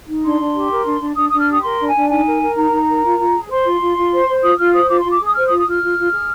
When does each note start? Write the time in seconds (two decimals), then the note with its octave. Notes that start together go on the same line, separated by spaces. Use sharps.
0.08 D#4
0.23 D4 C6
0.39 D4
0.55 G4
0.69 A#4
0.85 D4
1.01 D4
1.16 D4 D#6
1.28 D4 D#6
1.40 F6
1.47 G4 D#6
1.63 A#4 C6
1.78 D4
1.87 G#5
1.94 D4
2.09 D#4 G#5
2.24 A#4
2.40 A#4
2.56 D#4 A#5
2.72 D#4
2.87 A#4
3.03 F4
3.18 F4
3.33 G#4
3.49 C5 C6
3.65 F4
3.80 F4
3.96 F4
4.11 C5
4.27 C5
4.42 F4 D#6
4.58 F4 F6
4.73 C5 D#6
4.88 F4 D6
5.00 F4 C6
5.12 D6
5.19 G#4 D#6
5.35 C5 F6
5.47 D#6
5.51 F4
5.58 D#6
5.67 F4 F6
5.82 F4
5.97 F4
6.12 G#4